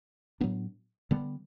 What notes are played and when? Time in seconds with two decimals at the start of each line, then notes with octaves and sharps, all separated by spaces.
0.41 A2 F#3 B3 D4
1.11 D3 G3 B3